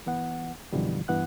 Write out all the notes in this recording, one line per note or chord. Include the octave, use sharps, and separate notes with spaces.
E3 B3 F#5
F#2 B2 D3 E3 F3 G3
G2 E3 B3 F#5 F#6